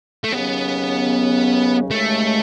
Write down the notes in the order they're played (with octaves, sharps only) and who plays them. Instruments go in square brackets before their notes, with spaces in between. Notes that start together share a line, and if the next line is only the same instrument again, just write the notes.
[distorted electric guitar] A3
[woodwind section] D#2 C#3 F#3 C#4 [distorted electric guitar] B3
[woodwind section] D#2 C#3 G#3 [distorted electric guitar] A3